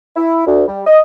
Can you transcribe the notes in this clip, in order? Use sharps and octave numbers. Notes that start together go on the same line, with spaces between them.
E4
D2
G3
D#5